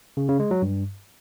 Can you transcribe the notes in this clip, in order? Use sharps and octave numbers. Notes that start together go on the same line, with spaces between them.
C#3
C#3
G#3
F#3
G2